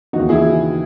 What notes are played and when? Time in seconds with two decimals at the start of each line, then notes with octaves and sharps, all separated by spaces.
0.13 E3 D#4 F#4
0.16 D#2 C#3
0.29 E4 G#4